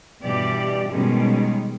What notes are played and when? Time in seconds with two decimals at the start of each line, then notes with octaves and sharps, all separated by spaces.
0.23 G2 B2 E3 G4 D5
0.90 B2 D#3 G3 G#3 C#4